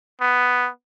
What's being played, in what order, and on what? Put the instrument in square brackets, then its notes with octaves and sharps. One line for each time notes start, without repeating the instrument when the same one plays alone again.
[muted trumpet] B3